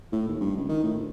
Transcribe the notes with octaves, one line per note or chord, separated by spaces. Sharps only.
A2
D#2
G2
C#2
D#3
A2
D2